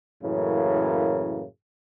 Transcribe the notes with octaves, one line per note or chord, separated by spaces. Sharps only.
F#2 A2 C#3 E3 A#3